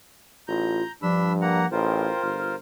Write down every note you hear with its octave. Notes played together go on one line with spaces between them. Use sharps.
A1 F4 A#5 G6
G2 F3 D4 B5 E6
A#3 F#5 A#5
A1 F4 A#4 C5 G5
G1 F6